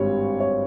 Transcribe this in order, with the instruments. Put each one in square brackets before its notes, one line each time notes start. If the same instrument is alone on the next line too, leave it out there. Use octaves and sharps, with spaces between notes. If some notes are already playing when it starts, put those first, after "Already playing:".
Already playing: [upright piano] G#1 G2 G3 C#5
C#5